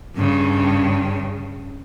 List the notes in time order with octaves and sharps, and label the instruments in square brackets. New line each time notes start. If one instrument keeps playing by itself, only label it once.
[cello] G2 C#3